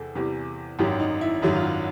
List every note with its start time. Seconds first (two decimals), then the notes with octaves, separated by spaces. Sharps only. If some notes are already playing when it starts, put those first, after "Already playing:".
Already playing: E2 C3 E3 G#4 A4
0.15 E2 C3 E3 G3
0.79 G#1 F#2 D#3 F#3 G4
1.00 D#4
1.21 E4
1.42 G#1 F#2 D#3 F#3 E4
1.55 F4
1.63 F#4